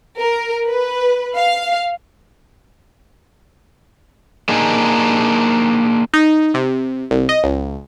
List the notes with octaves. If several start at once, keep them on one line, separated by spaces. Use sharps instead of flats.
A#4
B4
F5
A#3 D4 D#4 G#4
D#4
C3
C2
D#5
C#2